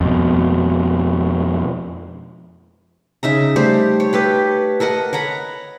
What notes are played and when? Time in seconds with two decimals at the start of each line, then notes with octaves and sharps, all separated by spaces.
0.01 F2 B2
3.23 C#3 D#4 E5 A#5
3.56 G3 A3 G4 C5
4.00 C#5
4.13 G4 A4 B4 G5
4.80 A4 A#4 D#5 F#5
5.13 C#5 F#5 A#5 B5